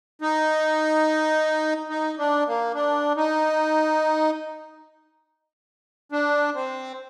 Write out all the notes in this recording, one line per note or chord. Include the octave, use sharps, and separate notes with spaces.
D#4
D#4
D4
A#3
D4
D#4
D4
C4